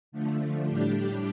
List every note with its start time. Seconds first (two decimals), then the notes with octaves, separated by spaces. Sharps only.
0.12 D3 F3 A3
0.66 A2 G3 D4 G4